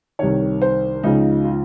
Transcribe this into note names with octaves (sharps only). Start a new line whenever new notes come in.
C2 C3 D#3 C#5
C5
C#2 C#3 F3 D#4
F4